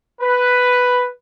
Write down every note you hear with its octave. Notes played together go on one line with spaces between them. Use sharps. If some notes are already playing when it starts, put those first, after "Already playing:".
B4